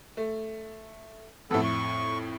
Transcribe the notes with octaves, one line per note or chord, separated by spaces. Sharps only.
A3
F2 A2 B3 A4
C#6